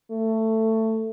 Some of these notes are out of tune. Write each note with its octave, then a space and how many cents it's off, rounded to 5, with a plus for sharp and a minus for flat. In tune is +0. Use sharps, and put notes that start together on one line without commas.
A3 +15